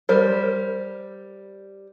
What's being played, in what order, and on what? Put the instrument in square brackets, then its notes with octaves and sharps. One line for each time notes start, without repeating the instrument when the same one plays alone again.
[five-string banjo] G3 A#4 C5